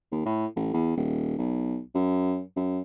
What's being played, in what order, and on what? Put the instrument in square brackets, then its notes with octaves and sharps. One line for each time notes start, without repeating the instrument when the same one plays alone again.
[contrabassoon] D#2
A2
A1
E2
D#1
B1
F#2
F#2